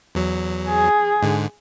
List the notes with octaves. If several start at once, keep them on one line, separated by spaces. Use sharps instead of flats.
E2 F#3
G#4
G#2 D3